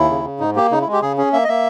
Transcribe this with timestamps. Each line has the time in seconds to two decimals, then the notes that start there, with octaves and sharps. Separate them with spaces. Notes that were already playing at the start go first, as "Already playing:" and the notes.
Already playing: D#2 E4
0.09 C#3
0.25 C#3
0.40 G#2 D#4
0.55 A#3 G4
0.71 C#3 D#4
0.81 E4
0.87 G#3
0.92 G4
1.02 C#3 G#4
1.18 C#4 G#4
1.33 A#3 E5
1.44 D#5
1.48 A#3 E5